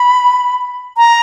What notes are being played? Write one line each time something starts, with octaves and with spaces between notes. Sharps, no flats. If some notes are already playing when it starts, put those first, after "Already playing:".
Already playing: B5
A#5